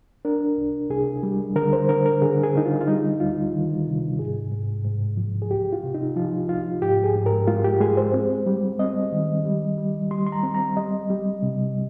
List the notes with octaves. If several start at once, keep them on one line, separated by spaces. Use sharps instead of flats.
D4 A#4
C2
C2 G#4
G3
D3 A#4
C5
D3 A#4
A#4
D3 G#4
G#4
D3 D#4
F4
F4
G3 D#4
D2 F4
D#3
C3
G#2 G#4
G#2
G#2
F3
G#4
C2 G4
F4
C3
D#4
F3 F4
C2 F4
G#2 G4
G#4
G#2
A#4
G#3 F4
G4
G#3 G#4
C5
C4
G3
C4 D#5
D#3
G3
G3
G3 C6
C6
A#5
C4
A#5
G3 D#5
G3
C3